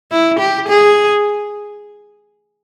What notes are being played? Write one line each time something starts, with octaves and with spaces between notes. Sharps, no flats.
E4
G4
G#4